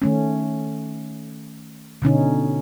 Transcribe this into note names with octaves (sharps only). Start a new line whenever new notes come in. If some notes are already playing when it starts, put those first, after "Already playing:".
D#3 A3 C#4
B2 D3 C#4 D#4